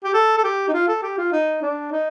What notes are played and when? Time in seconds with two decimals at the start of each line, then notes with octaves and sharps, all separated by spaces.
0.04 G4
0.14 A4
0.37 A4
0.44 G4
0.68 D#4
0.74 F4
0.88 A4
1.03 G4
1.18 F4
1.32 D#4
1.63 D4
1.92 D#4